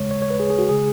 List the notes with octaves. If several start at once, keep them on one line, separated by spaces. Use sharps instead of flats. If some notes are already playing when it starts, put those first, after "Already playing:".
Already playing: D#2 C#3 G#3 C#5
C#5
C#5
B4
G#4
G#4
F#4
C#3 G#3 G#4